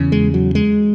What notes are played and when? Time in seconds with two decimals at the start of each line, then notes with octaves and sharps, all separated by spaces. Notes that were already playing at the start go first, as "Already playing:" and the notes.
Already playing: E2 C#3
0.12 G#3
0.34 F#3
0.55 G#3